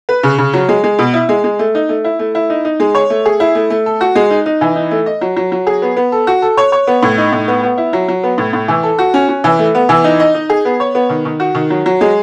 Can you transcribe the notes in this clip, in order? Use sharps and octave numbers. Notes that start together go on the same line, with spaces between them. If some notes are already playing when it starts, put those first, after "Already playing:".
B4
C#3
C#3
F#3
G#3
G#3
B2
E4
G#3
G#3
A3
D#4
A3
E4
A3
E4
D#4
D#4
G#3
C#5
A3
G#4
E4
A3
A3
A4
F#4
G#3
D#4
D#4
E3
D#4
A3
D#5
F#3
F#3
F#3
G#4
B3
B3
A4
F#4
A4
C#5
C#5
B3
A2
D#4
A2
B3
B3
E4
F#3
F#3
B3
A2
A2
E3
A4
F#4
C#4
C#4
E3
A3
B3
E3
D#4
D#5
D#4
G#4
B3
C#5
B3
D#3
D#3
F#4
D#3
F#3
F#3
G#3